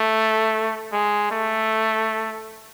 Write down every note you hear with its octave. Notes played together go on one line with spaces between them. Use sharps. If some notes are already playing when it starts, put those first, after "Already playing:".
Already playing: A3
G#3
A3